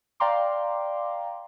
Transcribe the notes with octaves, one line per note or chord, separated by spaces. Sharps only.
D5 F5 G5 A#5 C6 D6